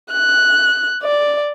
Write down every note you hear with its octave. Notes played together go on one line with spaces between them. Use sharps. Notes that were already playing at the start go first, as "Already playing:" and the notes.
F#6
D5